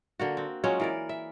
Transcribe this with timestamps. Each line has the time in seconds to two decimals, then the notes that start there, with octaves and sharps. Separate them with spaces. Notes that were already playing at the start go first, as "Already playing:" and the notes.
0.20 D3 A#3 F#4
0.37 C4
0.64 F#3 G#3 C#4 F4
0.80 E3 A#4 D5
1.09 E5